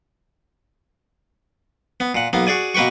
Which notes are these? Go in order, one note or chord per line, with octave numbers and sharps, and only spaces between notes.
B3
A#2 F#5
B1 A#3 B3
F#4 G#4 D5 G#5
B2 A#3 B4 G5 C#6